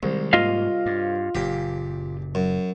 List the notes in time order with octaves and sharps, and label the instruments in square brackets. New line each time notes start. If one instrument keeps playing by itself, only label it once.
[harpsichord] C2 [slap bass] D#3 G#3
[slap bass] G#2 A#3 [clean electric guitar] F4 D#5 F5
[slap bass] G2
[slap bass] F#1 A#2 [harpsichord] G4
[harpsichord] F#2